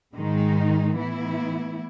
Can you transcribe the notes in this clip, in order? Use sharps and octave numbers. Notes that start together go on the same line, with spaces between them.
G#2 D#3 G#3 D#4
A2 E3 B3 E4